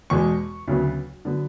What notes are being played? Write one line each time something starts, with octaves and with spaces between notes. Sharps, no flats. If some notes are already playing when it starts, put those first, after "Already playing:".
E2 B2 G#3 C#6
D2 C#3 F#3 B3
D3 F#3 B3